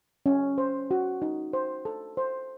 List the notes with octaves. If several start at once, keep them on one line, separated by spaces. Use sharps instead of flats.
C#4
C5
F#4
D#4
C5
A4
C5